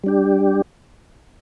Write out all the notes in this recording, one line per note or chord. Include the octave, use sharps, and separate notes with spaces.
G3 D4 G4